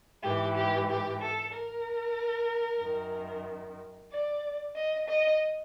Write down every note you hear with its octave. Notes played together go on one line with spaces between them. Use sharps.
G#2 E3 G4
G4
G4
A4
A#4
F#2 D#3
D5
D#5
D#5